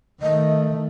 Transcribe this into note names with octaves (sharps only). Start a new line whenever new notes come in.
D#3 A3 D#5